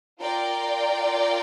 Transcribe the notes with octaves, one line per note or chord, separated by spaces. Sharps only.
F4 A#4 D5 G5